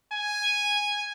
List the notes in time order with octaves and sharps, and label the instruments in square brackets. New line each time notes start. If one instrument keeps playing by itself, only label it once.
[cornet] G#5